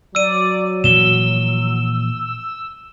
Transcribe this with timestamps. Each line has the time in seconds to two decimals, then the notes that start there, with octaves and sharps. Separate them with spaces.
0.15 F#3 D5 E6 D#7
0.84 A#2 E3 F3 E6 E7 G7